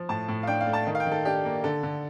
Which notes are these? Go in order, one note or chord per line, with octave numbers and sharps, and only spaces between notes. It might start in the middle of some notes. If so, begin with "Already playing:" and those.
Already playing: F3
A2 A5
A2
F5
D4 G5
F5
A3
A5
D#3
F5
G5
D#3
A4
D4 G4
A#3
D3 A4
D3